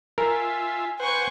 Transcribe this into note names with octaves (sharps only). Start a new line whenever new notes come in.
F4 A#4 E5 G#5
B4 C5 F#5 G#5 C#6